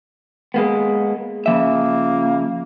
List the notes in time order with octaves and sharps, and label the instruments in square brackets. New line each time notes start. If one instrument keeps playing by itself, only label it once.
[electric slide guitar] G#3 A#3 B3
[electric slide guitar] C#3 F3 E5 [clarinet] A#3